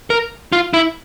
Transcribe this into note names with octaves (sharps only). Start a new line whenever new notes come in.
A#4
F4
E4